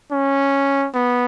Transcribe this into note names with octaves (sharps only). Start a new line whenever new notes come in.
C#4
B3